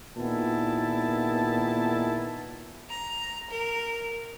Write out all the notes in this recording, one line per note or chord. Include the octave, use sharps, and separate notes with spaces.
A#2 D#3 B3 E4 G#4 A5
A#5
A#4